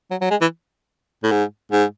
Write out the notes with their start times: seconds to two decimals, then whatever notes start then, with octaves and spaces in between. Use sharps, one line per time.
0.11 F#3
0.21 F#3
0.31 G#3
0.41 E3
1.23 A2
1.31 G#2
1.72 G#2